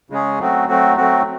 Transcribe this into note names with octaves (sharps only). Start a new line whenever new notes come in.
C#3 G#3 C#4 G#4
F#3 A3 C4 F#4
F#3 A3 C4 F#4
F#3 A3 C4 F#4